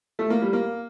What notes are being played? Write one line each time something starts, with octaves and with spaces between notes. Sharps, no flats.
A3
A#3
G3
A#3